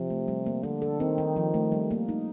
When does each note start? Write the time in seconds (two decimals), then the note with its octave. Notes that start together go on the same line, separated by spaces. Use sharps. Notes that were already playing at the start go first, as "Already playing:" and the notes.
Already playing: C3 F3
0.10 A3
0.28 G3
0.46 A#3
0.63 D3 D4
0.82 A4
1.00 D#3 C4
1.18 D#4
1.36 F3
1.54 A3
1.72 G3
1.91 A#3
2.09 D#4